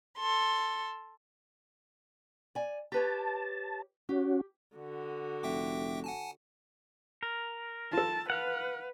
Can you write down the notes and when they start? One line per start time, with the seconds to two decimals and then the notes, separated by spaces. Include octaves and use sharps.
0.19 A4 C6
2.55 D5 G#5
2.92 G4 B4 C#5 A5
4.09 C#4 F#4 G4
4.76 D3 F#4
5.43 F1 E5 G5 D6
6.04 F#5 G#5 A5
7.23 A#4
7.93 F4 A4 A5
8.30 B4 F5 F#5